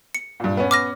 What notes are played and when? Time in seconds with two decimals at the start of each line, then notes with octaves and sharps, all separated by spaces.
0.15 C#7
0.40 G2 A#2
0.57 B3 C#4
0.71 D6 F6 A#6